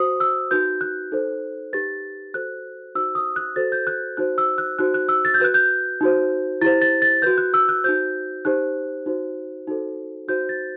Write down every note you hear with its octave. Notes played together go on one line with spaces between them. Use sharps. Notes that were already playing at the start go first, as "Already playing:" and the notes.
Already playing: F#4 C5 D#6
E6
D#4 F#4 B4 G6
F#6
D#4 A4 C5
D#4 G4 B4 A6
F#4 A4 C5 F#6
D#4 F#4 C5 E6
D#6
F#6
F#4 A4 C5 A6
G6
F#6
D#4 F#4 C5 F#6
E6
F#6
D#4 F#4 C5 F#6
F#6
E6
A6
G6
F#4 B4 F#6
G6
D#4 F#4 C5
E4 G4 C5 A6
A6
A6
F#4 B4 G6
F#6
E6
F#6
D#4 F#4 C5 G6
D#4 G4 C5 F#6
D#4 F#4 C5
D#4 F#4 A4 C5
D#4 F#4 C5 G6
A6